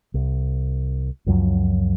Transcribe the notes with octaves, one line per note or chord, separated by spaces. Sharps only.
C2
C#2 F#2 F3 F#3